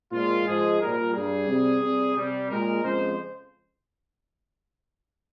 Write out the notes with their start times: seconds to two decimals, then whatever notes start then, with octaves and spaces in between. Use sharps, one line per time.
0.11 A#2 F3 G#3 F4
0.46 G#2 F3 G#3 G#4
0.79 A#2 G3 A#4
1.13 G2 G3 G#4
1.47 C3 G3
1.80 C3 G3
2.15 C3 G3
2.49 A#2 G#3 A#4
2.82 F2 C#3 F3 G#3 C5